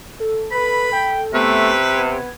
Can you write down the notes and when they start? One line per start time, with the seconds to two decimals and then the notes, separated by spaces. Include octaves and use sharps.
0.20 A4
0.52 B4 B5
0.92 G5
1.34 C3 A3 B3 B4
1.97 B3 G#6